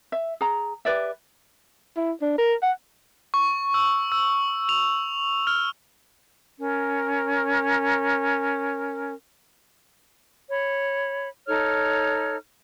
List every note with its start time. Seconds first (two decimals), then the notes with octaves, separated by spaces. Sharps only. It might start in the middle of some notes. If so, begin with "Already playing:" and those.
0.12 E5
0.41 G#4 A#5
0.85 G4 B4 D5 E5
1.97 E4
2.22 D4
2.38 A#4
2.63 F#5
3.34 C#6
3.74 E6
4.12 E6
4.69 F7
5.47 F6
6.59 C#4 A#4
10.50 C#5 B5
11.47 D#4 A4 C#5 F6